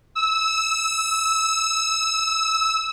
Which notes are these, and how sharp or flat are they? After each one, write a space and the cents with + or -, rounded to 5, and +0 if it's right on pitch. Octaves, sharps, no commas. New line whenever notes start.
E6 -20